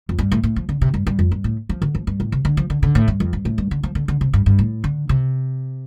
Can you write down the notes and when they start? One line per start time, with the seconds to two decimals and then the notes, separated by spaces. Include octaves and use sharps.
0.09 F2
0.18 G2
0.32 A2
0.43 A2
0.56 F3
0.69 D3
0.81 C3
0.94 G2
1.07 G2
1.19 F2
1.32 G2
1.44 A2
1.69 F3
1.82 D3
1.95 F3
2.07 G2
2.20 A2
2.32 C3
2.45 D3
2.57 F3
2.70 D3
2.83 D3
2.95 A2
3.08 G2
3.20 F2
3.33 G2
3.45 A2
3.58 G2
3.71 D3
3.83 F3
3.95 D3
4.08 D3
4.21 C3
4.33 G2
4.46 G2
4.59 A2
4.84 D3
5.09 C3